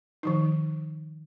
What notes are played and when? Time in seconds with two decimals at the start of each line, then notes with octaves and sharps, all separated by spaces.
0.23 D#3 F3 D#4